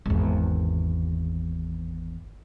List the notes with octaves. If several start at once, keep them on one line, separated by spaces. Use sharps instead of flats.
G#1 E2